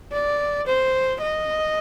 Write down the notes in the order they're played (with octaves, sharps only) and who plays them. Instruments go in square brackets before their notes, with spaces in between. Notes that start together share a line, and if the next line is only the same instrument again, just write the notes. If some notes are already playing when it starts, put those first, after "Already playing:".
[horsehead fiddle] D5
C5
D#5